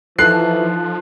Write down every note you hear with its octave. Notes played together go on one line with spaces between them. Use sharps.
E3 F3 D#4 A4 A5 F#6 C7